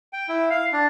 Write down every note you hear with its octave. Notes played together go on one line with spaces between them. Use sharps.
G5
E4
F5
D4